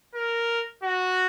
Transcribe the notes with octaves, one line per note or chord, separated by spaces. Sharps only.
A#4
F#4